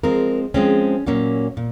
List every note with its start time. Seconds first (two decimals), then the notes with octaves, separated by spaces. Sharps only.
0.03 F3 G#3 C4 A#4
0.54 F3 G#3 C4 C#4
1.06 A#2 F#3 A#3 C#4
1.57 A#2